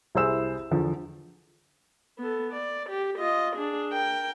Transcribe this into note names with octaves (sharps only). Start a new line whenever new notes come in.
C2 E4 G#4 C5 E6 E7
E2 D3 F3
B3 A4
D5
G4
F4 D#5
D4 G#4
A#4 G5